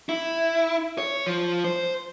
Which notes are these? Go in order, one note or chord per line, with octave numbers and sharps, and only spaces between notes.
E4
C#5
F3
C5